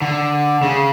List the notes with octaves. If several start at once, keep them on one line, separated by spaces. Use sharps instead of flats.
D3
C#3